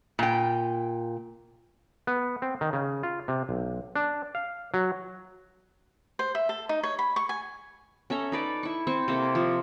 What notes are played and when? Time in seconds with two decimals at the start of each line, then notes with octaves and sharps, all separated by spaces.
0.19 A#2 G5
2.07 B3
2.42 C4
2.61 D#3
2.73 C#3
3.03 F4
3.28 C3
3.49 B1
3.95 D4
4.35 F5
4.74 F#3
6.19 C5
6.35 E5
6.49 A4
6.69 D#4
6.83 C#5
6.99 B5
7.16 C#6
7.29 G#5
8.10 C#4 A4 E5 A#5
8.32 D#4 B4 D5
8.63 E4 C#6
8.87 C4 C5 C#6
9.08 C3 A#3 A4
9.35 F3